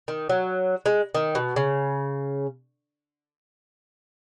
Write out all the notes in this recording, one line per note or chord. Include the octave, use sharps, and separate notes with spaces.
D#3
F#3
G#3
D#3
B2
C#3